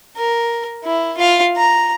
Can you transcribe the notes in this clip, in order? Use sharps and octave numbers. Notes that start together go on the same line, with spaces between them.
A#4
E4
F4 F5
A#5